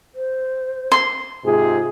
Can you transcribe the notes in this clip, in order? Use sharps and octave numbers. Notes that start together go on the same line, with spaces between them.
C5
C6
G#2 C3 F4 G#4